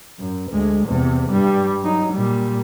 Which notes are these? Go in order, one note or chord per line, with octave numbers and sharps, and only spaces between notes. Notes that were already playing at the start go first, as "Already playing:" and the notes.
F#2
D2 G#3
E2 C3
G2 G3
F#3 D#4
A#2 G3